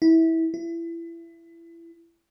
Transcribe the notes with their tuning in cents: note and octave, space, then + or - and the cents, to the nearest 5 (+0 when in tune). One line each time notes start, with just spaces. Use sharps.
E4 -20
E4 +25